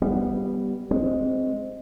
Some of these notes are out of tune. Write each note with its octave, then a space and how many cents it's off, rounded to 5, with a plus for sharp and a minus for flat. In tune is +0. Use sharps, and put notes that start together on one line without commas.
G3 +0 B3 +0
G#3 +0 C4 +0